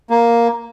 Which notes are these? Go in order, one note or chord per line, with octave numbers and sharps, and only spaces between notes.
A#3